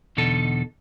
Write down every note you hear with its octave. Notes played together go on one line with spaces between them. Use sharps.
E2 B2 D3 D#4 A4